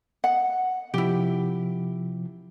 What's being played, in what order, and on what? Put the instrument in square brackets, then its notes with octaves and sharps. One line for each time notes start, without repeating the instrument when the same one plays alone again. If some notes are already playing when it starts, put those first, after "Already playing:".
[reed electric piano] D#5 [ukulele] F#5
[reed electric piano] C3 F3 [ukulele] E4 G4